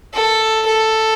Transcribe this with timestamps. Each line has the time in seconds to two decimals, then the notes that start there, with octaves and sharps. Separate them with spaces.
0.14 A4
0.66 A4